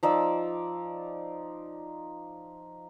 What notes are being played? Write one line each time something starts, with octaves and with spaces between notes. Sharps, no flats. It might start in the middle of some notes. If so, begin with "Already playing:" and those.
F3 D#4 D5 E6